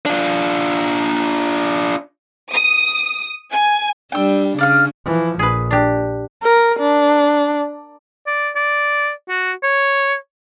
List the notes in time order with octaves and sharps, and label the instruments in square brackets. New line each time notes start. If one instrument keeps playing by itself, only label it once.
[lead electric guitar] D4 F4
[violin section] D#6
G#5
[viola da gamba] G3 D4 [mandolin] G5 E6
[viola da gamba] C#3 [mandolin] D4 F5 F6
[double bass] E3 F3
[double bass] A#1 [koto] G#4 B4
[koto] D4 G4
[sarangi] A#4
D4
[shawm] D5
D5
F#4
C#5